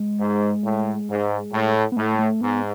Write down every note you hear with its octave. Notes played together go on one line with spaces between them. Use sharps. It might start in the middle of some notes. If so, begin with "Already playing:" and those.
Already playing: G#3
G#2
A2
G#2
A2
B3
A2 A3
A3
G#2 B3